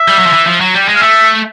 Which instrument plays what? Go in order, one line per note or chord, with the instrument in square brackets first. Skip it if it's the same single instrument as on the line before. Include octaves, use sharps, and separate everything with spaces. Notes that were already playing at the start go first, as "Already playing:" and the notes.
Already playing: [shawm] E5
[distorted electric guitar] G3
F#3
F3
E3
F3
F#3
G3
G#3
[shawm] F5
[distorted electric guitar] A3 [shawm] E5